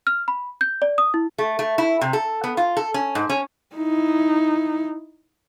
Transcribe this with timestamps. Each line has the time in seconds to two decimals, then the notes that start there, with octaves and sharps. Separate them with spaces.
0.07 F6
0.28 B5
0.61 G6
0.82 D5
0.98 D#6
1.14 E4
1.38 A3
1.59 A3
1.78 E4
2.01 C3
2.13 A4
2.44 B3
2.57 F4
2.77 A4
2.94 C#4
3.15 G#2
3.30 C#4
3.76 D#4 E4